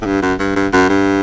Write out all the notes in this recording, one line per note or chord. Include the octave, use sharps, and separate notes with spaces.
A2
G2
F#2
G2
G2
F#2
G2